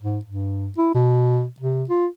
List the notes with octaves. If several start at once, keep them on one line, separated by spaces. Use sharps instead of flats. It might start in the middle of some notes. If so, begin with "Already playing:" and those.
G#2
G2
E4
B2
C3
F4